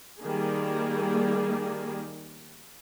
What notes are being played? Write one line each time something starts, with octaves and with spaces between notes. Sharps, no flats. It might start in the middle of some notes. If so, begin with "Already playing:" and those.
D#3 G3 A#3 G#4